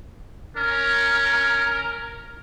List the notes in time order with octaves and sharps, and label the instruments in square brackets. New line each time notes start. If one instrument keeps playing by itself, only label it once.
[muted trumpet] C#4 [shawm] A#4